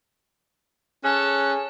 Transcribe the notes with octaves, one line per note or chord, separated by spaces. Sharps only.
C#4 G#4 A4 F#6